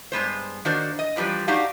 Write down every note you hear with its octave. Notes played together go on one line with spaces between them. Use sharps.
G2 G#3 B3 C5
D#3 A#3 D4 F#4 C5
D#5
E2 F3 G3 D4 B4
D4 D#4 F#4 G4 F5